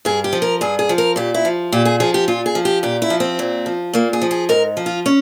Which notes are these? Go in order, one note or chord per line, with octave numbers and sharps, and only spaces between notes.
G2 G#4
G4
F3
A#4
G2 G#4
G#4
F3
A#4
A#2 G4
E4
F3
A#2 G4
G#4
F3 G#4
G4
A#2 F4
G#4
F3
G4
A#2 G4
E4
F3
C4
A#2
F3
A#2 A#3
G#4
F3
G#4
G#2 A#4
F3
F4
C#4